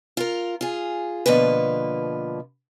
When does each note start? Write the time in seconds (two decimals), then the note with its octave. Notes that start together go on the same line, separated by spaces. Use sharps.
0.17 F4 A#4
0.61 F4 G#4
1.26 B2 D3 F3 A#3 B4